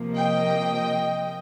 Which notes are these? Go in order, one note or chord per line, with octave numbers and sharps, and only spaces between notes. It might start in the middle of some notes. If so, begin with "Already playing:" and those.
Already playing: C3 F3 A#3
D#5 G5